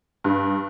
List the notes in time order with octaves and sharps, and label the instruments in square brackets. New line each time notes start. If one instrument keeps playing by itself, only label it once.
[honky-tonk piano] G2